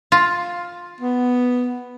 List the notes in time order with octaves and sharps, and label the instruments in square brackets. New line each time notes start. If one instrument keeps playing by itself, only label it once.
[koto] F4
[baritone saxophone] B3